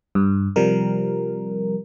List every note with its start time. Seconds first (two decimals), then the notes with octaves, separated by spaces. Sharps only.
0.15 G2
0.56 C3 F3 G3 A#4